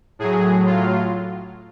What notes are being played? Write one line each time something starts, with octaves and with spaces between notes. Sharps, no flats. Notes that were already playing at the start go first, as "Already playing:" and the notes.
A2 F#3 G#4
F4